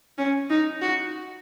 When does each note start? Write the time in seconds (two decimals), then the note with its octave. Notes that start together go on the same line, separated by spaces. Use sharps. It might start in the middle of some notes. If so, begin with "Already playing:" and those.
0.18 C#4
0.50 D#4
0.82 F#4